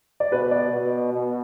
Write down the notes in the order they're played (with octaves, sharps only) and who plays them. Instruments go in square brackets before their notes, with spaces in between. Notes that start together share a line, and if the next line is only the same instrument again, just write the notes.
[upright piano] D5
[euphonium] B2 [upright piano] B4
[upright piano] D5
[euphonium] B2
B2